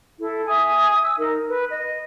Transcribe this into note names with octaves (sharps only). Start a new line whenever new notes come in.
E4 A4
E5 G#5 D#6
E6
D#4 A#4
B4
D#5